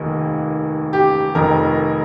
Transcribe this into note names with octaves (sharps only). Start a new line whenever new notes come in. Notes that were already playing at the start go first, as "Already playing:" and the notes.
Already playing: F1 D#2 D#3
G4
F1 F2 D#3 A#4